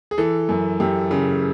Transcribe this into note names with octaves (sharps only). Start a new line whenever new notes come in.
G#4
E3 A4
F#2
F#2 G4
C#3